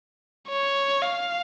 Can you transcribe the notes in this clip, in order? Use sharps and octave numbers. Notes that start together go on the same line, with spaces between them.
C#5
F5